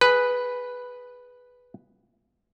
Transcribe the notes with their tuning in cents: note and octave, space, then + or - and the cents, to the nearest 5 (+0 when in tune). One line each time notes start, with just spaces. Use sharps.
G#4 +0 B4 +0